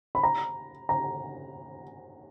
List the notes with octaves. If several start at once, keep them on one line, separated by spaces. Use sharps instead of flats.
B5
A#5
A#5